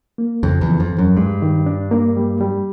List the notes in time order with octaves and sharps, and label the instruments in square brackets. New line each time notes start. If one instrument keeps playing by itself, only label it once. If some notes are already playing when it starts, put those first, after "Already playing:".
[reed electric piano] A#3
[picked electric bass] F2 [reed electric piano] C#3
[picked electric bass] E2
[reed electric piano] F3
[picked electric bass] F2
[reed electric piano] E2
[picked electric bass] F#2
[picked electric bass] G2 [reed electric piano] G#3
[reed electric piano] D#3
D4
A#3
G3
G3